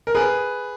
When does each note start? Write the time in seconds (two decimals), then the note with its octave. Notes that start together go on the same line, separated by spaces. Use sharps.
0.07 A#4
0.15 G#4 B4